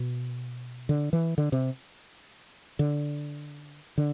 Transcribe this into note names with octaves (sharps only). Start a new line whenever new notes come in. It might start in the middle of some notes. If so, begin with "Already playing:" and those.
Already playing: B2
D3
E3
D3
C3
D3
D3